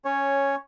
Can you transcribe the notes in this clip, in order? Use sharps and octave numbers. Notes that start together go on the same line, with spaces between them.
C#4 C#5